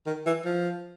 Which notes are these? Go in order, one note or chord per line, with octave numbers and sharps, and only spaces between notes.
D#3
E3
F3